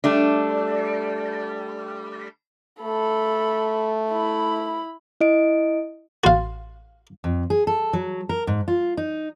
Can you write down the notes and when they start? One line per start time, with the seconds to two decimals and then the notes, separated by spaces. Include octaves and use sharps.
0.04 G3 A3 D4
2.82 A3 A4 B5
4.11 E4 B5
5.21 E4 D#5 D7
6.24 A1 F#4 F5 C6 A6
7.24 F2
7.50 G#4
7.67 A4
7.93 F#3
8.29 A#4
8.47 G#2
8.68 F4
8.97 D#4